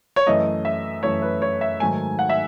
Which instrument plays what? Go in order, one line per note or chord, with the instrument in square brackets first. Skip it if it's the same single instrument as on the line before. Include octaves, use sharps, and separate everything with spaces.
[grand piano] C#5
F#2 E3 A3 D#5
E5
F#2 E3 A3 C#5
B4
C#5
E5
G#2 D#3 F#3 A3 G#5
F#5
E5